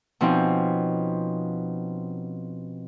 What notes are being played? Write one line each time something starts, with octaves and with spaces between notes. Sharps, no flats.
B2 F3 C4 C#4 D#4